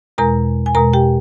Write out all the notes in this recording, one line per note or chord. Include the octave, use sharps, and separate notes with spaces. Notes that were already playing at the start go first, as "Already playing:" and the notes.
E2 B2 G#3 A#4 A#5
G#5
E2 B2 G#3 A#4 A#5
G4 G5